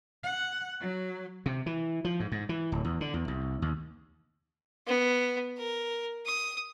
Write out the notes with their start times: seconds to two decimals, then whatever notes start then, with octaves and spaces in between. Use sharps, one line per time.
0.24 F#5
0.80 F#3
1.46 C3
1.66 E3
2.05 F3
2.20 G#2
2.32 G#2
2.49 E3
2.72 D1
2.85 E2
3.01 D3
3.14 E2
3.28 C2
3.62 D#2
4.87 B3
5.57 A#4
6.26 D#6